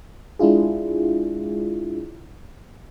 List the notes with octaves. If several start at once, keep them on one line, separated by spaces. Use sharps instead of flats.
G#3 D4 E4 F4 G#4